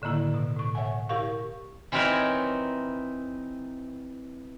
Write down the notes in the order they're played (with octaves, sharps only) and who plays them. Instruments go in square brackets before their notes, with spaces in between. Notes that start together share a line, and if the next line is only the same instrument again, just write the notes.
[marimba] A2 D3 D#3 A#3 E4
B2
A2 C#6
C#5 E5 F#5 G#5
E4 G4 A#4 F5 C#6
[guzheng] E3 C4 D#4 A#4 B4 C#5